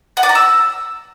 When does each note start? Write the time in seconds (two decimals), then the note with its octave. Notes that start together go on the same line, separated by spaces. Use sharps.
0.17 F#5
0.23 D5
0.29 A#5
0.35 E6